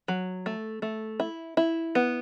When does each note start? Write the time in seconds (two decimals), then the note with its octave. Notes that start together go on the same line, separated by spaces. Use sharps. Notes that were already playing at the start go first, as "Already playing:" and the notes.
0.08 F#3
0.46 A3
0.82 A3
1.20 E4
1.57 E4
1.95 B3